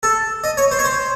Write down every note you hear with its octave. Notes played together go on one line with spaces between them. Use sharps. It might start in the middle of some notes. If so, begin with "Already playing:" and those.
A4
D#5
C#5
C5
C#5
C5